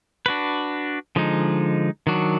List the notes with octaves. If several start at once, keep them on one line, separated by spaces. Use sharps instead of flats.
D4 F#4 B4
D3 F3 G#3 D#4
D#3 F#3 D4 F#4